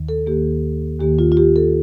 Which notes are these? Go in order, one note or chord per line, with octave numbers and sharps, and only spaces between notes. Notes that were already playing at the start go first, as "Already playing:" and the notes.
Already playing: D#2 D#3
A4
D#2 D#3 A#3 G4
D#2 D#3 A#3 G4
F4
F4
G4
A4